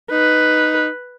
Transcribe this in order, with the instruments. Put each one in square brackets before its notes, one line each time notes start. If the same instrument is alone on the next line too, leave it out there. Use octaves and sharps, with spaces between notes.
[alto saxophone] D#4 [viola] B4